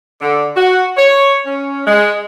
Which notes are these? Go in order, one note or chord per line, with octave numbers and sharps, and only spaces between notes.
D3
F#4
C#5
C#4
G#3